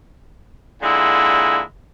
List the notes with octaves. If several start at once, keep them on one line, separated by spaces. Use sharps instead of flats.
A#2 D3 G#3 E4